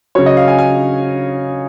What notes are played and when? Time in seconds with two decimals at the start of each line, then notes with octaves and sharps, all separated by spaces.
0.15 C#3 F#3 C#5
0.26 D#5
0.37 F5
0.48 G#5
0.58 G#5